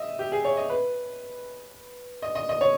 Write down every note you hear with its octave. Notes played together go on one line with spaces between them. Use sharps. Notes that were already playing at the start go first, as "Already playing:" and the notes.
Already playing: D#5 E5
G4
G#4
C#5
D#5
B4
D#5
D#5
D#5
C#5